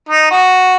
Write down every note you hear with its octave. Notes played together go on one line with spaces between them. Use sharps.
D#4
F#4